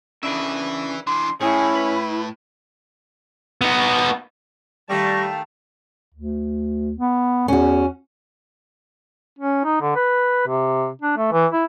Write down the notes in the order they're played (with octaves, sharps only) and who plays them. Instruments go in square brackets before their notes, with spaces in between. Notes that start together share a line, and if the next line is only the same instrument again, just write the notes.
[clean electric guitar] C#3 D4 E4 [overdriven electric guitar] B4 E5
[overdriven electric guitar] E3 D4 [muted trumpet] C6
[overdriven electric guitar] A2 [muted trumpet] C#4 [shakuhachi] E4 [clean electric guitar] G#4
[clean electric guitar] B4
[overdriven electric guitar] B3 D#4
[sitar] D#3 A3 G4 [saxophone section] G3 [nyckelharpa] F5 A5 [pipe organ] C#6 A#6
[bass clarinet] D2
B3
[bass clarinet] E2 [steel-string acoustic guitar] C#4 F#4
[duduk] C#4
D#4
D3
B4
C3
D4
A3
E3
E4